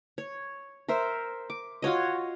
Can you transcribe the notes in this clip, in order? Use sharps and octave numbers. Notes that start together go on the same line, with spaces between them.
C#5
A#4 C5 E5
D6
F4 F#4 C#5 D#5